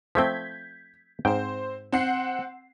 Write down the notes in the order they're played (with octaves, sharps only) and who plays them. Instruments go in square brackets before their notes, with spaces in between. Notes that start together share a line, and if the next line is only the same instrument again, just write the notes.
[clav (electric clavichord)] F3 A3 C4 [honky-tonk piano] G6 G#6 B6
[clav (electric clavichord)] G#2 G5 [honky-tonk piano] C4 C5
[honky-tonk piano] C4 F#5 C7